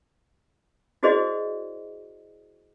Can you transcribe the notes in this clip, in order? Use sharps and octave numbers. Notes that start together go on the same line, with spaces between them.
E4 F#4 G#4 C5 D5 D#5